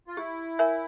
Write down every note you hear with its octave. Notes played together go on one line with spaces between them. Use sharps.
F4
E4 G4
A#4 C#5 E5 G#5